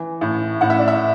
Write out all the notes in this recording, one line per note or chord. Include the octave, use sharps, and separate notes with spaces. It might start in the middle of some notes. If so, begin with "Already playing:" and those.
Already playing: E3
A2
A2 F#5
E5
D5
E5